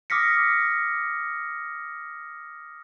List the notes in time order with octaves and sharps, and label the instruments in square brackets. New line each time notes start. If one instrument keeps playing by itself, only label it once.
[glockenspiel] D6 D#6 F6 A#6 B6 C#7